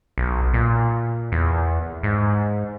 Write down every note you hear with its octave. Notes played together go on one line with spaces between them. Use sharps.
B1
A#2
E2
G#2